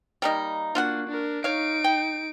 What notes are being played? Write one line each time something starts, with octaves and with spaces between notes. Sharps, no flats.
G3 A#3 D#4
A#3 D4 F4 F#4 F#5
D4 A#4
D#4 C#5 F5 D7
G5